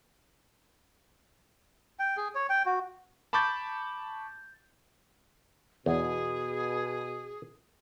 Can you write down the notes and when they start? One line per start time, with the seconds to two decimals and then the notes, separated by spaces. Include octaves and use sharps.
1.99 G5
2.17 G#4
2.35 C#5
2.49 G5
2.66 F#4
3.33 A5 B5 C#6 D6 G6 A6
5.86 E2 B2 G#4